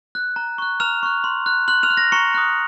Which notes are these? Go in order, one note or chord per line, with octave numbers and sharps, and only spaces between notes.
F#6
A#5
C#6 F#6
A#5 F6 F7
C#6 F#6
C6
F#6
C6 F#6 F#7
F6 F7
F#6
A#6
A#5 C#6 C#7
D#6 F#6